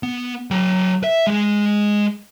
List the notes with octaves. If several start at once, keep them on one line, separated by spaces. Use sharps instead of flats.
B3
F#3 G5
E5
G#3 G#4